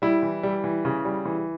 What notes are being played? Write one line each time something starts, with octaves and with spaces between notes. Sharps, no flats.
G3 E4
E3
G3
E3
C#3
G3
E3